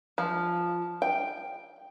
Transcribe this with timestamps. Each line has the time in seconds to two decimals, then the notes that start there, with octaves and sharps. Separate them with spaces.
0.18 F3
1.02 G5